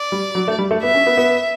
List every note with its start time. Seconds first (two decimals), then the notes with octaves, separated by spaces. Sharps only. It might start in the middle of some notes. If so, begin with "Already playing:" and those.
Already playing: D5
0.12 G3
0.35 F#3
0.48 A3
0.59 G3
0.71 A3
0.83 B3 E5
0.95 C#4
1.07 B3
1.17 B3